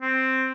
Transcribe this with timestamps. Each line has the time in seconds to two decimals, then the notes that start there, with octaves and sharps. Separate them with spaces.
0.02 C4